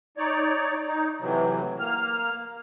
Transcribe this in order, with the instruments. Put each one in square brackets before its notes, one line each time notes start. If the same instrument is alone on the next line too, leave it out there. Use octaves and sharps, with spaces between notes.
[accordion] D#4 C#5 D5
D#4
A2 C3 E3 F#3
A#3 F6